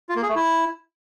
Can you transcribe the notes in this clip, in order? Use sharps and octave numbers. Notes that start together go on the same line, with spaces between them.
F4
A#3
G#4
A3
E4